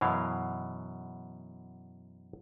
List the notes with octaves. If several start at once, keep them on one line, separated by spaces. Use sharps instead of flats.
F#2 B2 E3 F5